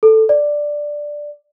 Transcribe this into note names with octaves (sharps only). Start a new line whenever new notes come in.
A4
D5